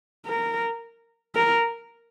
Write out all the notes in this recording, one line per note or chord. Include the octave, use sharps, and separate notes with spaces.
A#4
A#4